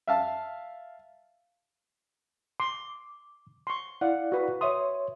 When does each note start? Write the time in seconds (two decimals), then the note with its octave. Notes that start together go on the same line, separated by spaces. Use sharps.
0.07 E5 F5 A5
2.60 C6 D6
3.67 C6 C#6
4.01 E4 D5 F5 F#5
4.32 F#4 B4
4.61 C#5 E5 C6 D#6